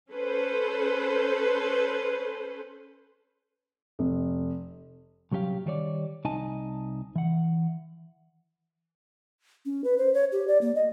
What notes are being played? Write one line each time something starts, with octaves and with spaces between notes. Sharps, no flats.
C#4 A4 B4 C5
F1
C2 F#3 C#4 G4 F5
D#3 G3 C#5 D5
C2 D#4 D#5 G#5 A5
E3 F#5
C#4
B4
C5
C#5
G4
D5
A#3
D#5